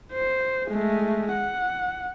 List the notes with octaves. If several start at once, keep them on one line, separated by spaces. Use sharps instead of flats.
C5
G#3 A3
F#5